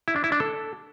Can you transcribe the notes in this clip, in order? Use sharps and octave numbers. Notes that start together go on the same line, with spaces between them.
E4
D4
E4
D4
A4